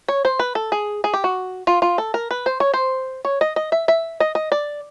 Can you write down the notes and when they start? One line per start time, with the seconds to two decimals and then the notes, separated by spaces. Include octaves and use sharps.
0.08 C#5
0.25 C5
0.39 B4
0.55 A4
0.72 G#4
1.04 G#4
1.13 G4
1.24 F#4
1.67 F4
1.82 F4
1.98 A4
2.14 A#4
2.31 B4
2.46 C5
2.60 C#5
2.74 C5
3.25 C#5
3.41 D#5
3.56 D#5
3.72 E5
3.88 E5
4.20 D#5
4.35 D#5
4.52 D5